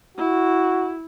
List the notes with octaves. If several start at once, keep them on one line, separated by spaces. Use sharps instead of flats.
E4 F#4